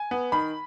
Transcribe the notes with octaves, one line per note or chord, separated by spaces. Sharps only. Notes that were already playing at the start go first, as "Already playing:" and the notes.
Already playing: G#5
B3
D#3 B5